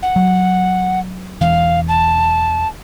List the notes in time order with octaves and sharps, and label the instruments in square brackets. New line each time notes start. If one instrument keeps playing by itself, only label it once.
[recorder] F#5
[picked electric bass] F#3
[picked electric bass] E1 E3 [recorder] F5
[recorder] A5